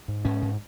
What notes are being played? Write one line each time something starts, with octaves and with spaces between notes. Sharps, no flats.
G#2
G#2 C#4
G#2